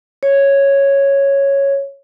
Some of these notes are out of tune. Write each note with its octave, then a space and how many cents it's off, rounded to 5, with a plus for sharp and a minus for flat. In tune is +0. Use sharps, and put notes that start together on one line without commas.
C#5 -5